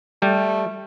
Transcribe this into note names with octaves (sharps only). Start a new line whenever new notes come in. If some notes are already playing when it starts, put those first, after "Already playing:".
G3 A3